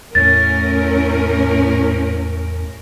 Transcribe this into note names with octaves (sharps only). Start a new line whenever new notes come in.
E2 A2 C#4 A#4 A6